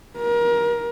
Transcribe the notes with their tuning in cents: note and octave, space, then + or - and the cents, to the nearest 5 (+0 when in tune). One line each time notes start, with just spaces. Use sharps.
A#4 +30